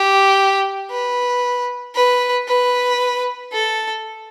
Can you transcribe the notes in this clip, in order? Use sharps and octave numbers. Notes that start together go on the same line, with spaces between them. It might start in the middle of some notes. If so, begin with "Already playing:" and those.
Already playing: G4
B4
B4
B4
A4